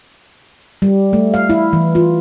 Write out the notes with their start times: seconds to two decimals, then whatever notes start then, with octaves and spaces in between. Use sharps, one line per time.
0.82 G3
1.13 A3
1.34 F5
1.50 E4
1.73 E3
1.95 F4